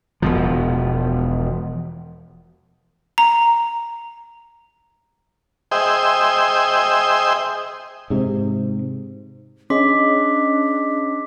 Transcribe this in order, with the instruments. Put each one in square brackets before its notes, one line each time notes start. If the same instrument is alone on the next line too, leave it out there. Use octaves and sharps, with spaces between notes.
[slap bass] E1 B2 F3
[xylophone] A#5
[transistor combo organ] G#4 C5 D#5 E5 G5
[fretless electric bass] G#2 C3
[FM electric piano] C#4 G#4 D#5 [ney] D4 [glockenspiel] C6 D6 B6